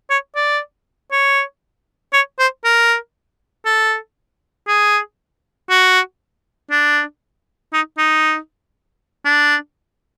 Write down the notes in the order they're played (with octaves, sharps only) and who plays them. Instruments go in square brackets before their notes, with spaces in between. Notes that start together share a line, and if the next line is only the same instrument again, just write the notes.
[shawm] C#5
D5
C#5
C#5
C5
A#4
A4
G#4
F#4
D4
D#4
D#4
D4